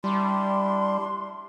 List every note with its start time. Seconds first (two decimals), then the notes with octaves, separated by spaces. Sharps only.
0.04 G3 D4 E4 C6